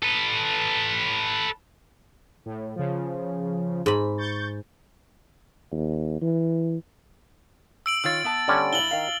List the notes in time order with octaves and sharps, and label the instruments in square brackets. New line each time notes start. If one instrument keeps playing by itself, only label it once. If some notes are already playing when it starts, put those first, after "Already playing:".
[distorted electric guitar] A4 B4
[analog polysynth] A2
C#3 F3
[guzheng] G#2 B5
[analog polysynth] C#6 G6 A6
[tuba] D#2
E3
[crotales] E6 D7 F#7
[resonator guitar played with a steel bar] D#3 F4 C#5 [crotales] E6 A6
[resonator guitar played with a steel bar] B3 E5 A5
[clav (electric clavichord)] D3 G3 C#4
[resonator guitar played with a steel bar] G2 E4 [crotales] F#7 G7
[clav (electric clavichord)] D#3 A#5 [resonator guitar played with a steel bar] F5